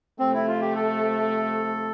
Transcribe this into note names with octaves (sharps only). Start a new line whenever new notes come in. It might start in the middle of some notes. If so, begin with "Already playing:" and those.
C3 F3 A3 C4
E4
F4
G4
A4